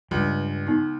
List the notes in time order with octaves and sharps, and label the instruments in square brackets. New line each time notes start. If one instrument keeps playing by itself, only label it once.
[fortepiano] C#2 [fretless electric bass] G2 G3
[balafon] B3 D#4